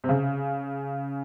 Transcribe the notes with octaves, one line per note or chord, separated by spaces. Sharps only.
C3
C#3